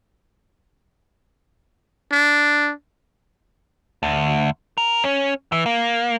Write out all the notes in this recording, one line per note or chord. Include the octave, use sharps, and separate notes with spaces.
D4
D2
A#4
C#4
E3
A#3